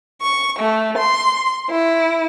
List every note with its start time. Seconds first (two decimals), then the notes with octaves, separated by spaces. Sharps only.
0.21 C#6
0.59 A3
0.97 C6
1.71 E4